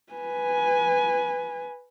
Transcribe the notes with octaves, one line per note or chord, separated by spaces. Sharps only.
B4 G#5